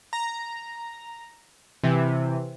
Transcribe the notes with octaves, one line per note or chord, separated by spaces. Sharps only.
A#5
C3 E3